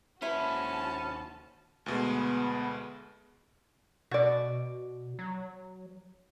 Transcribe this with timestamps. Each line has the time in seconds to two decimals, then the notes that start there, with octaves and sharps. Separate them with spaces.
0.22 D#2 C#4 E4 F#4 B4 C5 A5
1.86 D2 B2 G#3 B3
4.11 B2 F#4 D5
5.19 F#3